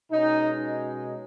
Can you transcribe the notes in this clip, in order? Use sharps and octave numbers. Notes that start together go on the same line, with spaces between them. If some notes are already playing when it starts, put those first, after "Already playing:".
B2 G#3 C#4 D#4